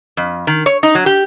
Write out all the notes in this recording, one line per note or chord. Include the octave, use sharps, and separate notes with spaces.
F2
D#3
C#5
D#4
F#3
G4